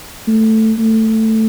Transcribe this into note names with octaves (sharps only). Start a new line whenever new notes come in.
A3
A3